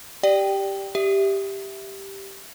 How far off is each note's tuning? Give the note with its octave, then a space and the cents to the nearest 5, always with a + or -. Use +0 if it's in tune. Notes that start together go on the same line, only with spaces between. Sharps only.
G4 +0 D5 +0 G5 +0
G4 +0 E5 +0